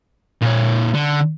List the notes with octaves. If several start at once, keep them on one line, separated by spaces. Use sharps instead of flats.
A#2 C#5
D3